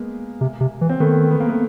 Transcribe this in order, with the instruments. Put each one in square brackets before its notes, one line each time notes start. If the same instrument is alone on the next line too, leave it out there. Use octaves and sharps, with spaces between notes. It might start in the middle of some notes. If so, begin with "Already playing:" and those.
Already playing: [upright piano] G#3 A#3 B3
[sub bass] C3
C3
E3
[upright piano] C4
[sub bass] D#3 [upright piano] A3 B3
[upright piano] B3
A#3
A3 B3